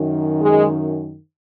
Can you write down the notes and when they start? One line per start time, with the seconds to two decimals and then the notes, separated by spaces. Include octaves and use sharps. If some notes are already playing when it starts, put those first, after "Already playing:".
Already playing: F#2 D#3
0.41 G#3